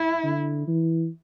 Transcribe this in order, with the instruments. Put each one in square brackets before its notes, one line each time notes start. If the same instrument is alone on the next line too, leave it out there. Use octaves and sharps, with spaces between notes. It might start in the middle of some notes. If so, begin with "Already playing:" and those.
Already playing: [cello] E4
[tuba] D3
E3